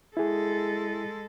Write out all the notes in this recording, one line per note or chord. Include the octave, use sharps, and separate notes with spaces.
G#3 E4 G#4 A4